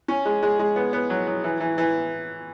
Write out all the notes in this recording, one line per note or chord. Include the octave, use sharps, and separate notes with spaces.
C#4
G#3
G#3
G#3
B3
B3
F#3
F#3
E3
E3
E3